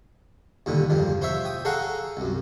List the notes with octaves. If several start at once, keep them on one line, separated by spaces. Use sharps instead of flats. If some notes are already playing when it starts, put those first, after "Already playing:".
D#2 A#2 D3 G3
E2 G2 F3
F4 C5 C#5 E5
G5 D#6
G#4 A4 C#5 F5 F#5 A#5
C2 F#2